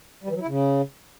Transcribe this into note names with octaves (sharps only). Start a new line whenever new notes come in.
G3
E3
F#3
E4
C#3